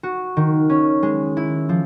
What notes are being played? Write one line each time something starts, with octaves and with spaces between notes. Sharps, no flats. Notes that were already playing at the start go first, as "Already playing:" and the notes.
F#4
D#3
C#4
G#3
E4
F3